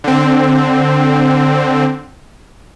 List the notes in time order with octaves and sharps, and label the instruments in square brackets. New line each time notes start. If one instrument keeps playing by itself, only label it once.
[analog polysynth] D3 C4